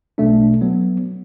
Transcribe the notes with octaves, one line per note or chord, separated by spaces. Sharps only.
B1 B2 A3 D4
F#3 B3